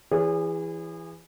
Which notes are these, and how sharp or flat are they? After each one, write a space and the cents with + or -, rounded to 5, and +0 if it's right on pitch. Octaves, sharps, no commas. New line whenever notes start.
E3 +15 G#4 -30 C#5 +30